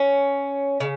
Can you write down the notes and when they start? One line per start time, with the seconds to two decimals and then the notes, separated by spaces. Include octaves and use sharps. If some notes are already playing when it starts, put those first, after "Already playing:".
Already playing: C#4
0.80 C#3